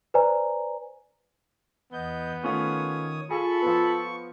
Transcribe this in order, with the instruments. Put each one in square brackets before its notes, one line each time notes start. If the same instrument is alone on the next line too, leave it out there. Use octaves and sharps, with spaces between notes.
[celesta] B4 C5 D5 G#5 A#5
[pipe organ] E2 D#5 G6 [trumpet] B3
[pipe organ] D#3 C#5 D#6 [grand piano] A3 C#4 F4
[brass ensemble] F4 A4 [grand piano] G#4 [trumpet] B5 [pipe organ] C#6
[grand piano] F3 B3